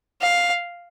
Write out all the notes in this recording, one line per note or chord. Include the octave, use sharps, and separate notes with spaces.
F5